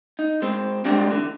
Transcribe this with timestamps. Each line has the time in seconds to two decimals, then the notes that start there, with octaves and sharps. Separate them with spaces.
0.19 D#4
0.42 G#3 C4
0.85 G3 G#3 C4 D4
1.11 D3 E3